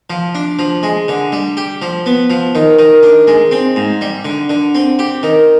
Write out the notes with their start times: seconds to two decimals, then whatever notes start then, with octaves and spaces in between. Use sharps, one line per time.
0.10 F3
0.35 D4
0.59 F3
0.83 G#3
1.08 D3
1.32 G3
1.57 G4
1.82 F3
2.06 B3
2.30 F3
2.55 D#3
2.79 D#3
3.03 D4
3.27 G#3
3.51 C4
3.76 G#2
4.01 G3
4.25 D3
4.49 D3
4.75 C4
4.99 G4
5.23 D#3